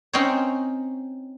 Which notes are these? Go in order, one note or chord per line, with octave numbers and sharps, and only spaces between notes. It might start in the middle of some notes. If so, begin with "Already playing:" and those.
C4 C#4 D#4 C5 C#5